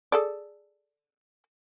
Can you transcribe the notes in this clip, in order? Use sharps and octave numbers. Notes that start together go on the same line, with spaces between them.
G#4 A4 D5